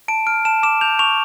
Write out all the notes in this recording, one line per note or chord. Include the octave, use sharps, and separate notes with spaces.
A5 D7
F6 D7
A5 E7
D6 E7
G6 F7
C#6 F7